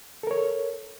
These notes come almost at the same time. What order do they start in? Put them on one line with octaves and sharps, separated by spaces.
A4 A#4 C#5